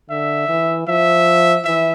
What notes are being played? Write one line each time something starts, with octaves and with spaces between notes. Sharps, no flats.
D3 E5
E3
F3 E5
E3 E5